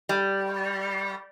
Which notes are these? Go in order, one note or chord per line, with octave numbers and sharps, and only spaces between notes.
G3